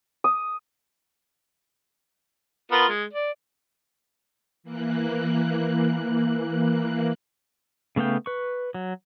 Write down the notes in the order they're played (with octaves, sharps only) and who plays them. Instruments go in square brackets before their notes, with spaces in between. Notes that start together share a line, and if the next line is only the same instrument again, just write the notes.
[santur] D#6
[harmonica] B3 F4 A#4
G#3
D5
[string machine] E3 A#3 F#6
[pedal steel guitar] C#3 A3 B3 F5 G5
B4 C#6
F#3